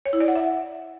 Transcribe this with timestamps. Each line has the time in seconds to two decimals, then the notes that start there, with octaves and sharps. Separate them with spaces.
0.06 C#5
0.13 E4
0.20 D5
0.28 F#5
0.35 E5